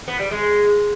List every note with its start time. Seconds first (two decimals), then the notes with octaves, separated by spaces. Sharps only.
0.08 B3
0.19 G3
0.31 G#3